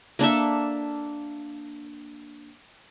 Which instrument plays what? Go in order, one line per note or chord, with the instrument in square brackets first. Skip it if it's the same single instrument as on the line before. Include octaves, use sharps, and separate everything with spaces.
[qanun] A#3 D4 A4 E5